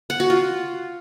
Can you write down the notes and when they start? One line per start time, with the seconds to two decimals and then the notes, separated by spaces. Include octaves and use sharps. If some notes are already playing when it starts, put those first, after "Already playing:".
0.10 F#5
0.20 F#4
0.30 F4